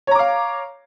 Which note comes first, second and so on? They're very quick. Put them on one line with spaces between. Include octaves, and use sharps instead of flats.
C#5 A#5 D6 F5